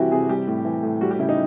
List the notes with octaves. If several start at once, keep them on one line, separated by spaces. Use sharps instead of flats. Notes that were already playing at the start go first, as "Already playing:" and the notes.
Already playing: C3 E3 G3 E4 F#4 G4
C3 G#4
G3 G4
A2
E3
A2
G3 F#4
G4
C#3 E4
D#4